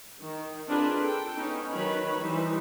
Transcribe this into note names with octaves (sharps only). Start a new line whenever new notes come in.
D#3
C4 D4 F4 G#4 A#4 B4
A4 G5
B3 C#4 D#4
D#3 F#3 B4 C#5 B5
E3 G3 D#4 C5